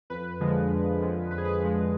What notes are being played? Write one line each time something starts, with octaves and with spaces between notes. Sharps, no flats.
F2 B4
D3 F3 G#3
F2
D3 F3 G#3
F2 B4
G#4
B4
D3 F3 G#3